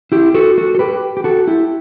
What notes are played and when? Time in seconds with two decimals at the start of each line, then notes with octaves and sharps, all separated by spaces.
0.12 E4 G4
0.34 F#4 A4
0.58 F#4 A4
0.75 A4
0.79 G4 B4
1.17 G4
1.24 F#4 A4
1.47 E4 G4